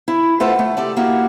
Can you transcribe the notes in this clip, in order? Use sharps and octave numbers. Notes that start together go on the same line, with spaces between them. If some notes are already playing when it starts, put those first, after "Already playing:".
E4
A3 F4 A4 B4 C5 F#5
A3
G4 A4 D5
A#3 E4 F#4 G4